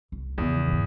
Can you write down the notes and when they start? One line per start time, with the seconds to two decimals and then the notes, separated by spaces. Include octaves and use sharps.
0.12 C2
0.38 E2 C#3 F3
0.68 G#2 D#3